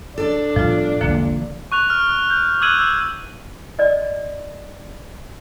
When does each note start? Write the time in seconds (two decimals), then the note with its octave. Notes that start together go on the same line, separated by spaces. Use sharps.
0.18 D4 A4 D5
0.56 A2 F3 G3 B3 F4
1.01 E1 A#1 D3 F3 A#3
1.72 C#6 F#6 F7
1.90 F6
2.30 G6
2.61 D6 E6 F#6 G#6 D#7 F#7
2.79 E6
3.79 D5 D#5